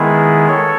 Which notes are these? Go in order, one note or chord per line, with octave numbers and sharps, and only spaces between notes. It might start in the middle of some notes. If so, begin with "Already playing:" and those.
Already playing: D#3 G#3 B3 E4 G#4
A4 C#5